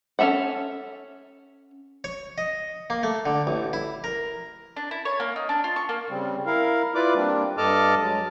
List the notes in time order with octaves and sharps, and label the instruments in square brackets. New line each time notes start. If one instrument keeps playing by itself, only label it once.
[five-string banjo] C#4 F4 A4 E5 F#5
[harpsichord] C#5
D#5
A#3
A3
D3
A1
E4
A#4
[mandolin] D4
E4
C#5
A#3
D#4
D4
F4
C#6
A#3
[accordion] C#3 G3 C4
E4 A#4 F5
E4 F4 B4 D5 D6
G3 A#3 C4 D4
G2 A4 D#5 A5 D6 F6
F#3 G#3